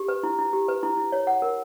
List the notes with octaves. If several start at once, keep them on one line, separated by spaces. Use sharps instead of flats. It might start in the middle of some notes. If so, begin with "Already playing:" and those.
Already playing: G4
B4
E4
E4
G4
B4
E4
E4
C#5
F#5
A#4